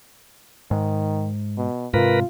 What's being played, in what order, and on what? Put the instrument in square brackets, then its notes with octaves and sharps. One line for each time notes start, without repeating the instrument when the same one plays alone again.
[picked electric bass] G#2 [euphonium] D#3
[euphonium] B2
[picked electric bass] G#2 C3 [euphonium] F4 [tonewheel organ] A#4 B4